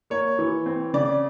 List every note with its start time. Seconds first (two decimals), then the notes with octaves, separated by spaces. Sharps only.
0.10 A#3 C#5
0.39 E3
0.66 C4
0.94 C#3 D5